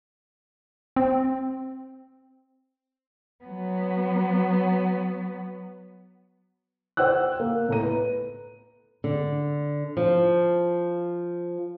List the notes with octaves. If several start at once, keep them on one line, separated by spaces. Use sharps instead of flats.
C4
F#3 B3
C5 F#5 G5 E6 F#6
A#3
A2 A#5 D#7
B4
D3
F3